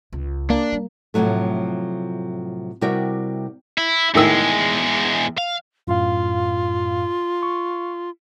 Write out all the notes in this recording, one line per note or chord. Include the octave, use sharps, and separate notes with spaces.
C#2
A#3 D4
G3
A2 C3 F3 F#3 A3
C3 G3 E4 F#4 A#4 G5
E4
E2 A2 D#3 G#3 E6
F5
F#2 A2 F4 F5
C#6